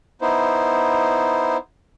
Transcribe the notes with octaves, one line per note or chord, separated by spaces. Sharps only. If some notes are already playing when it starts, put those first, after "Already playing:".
B3 D#4 E4 C5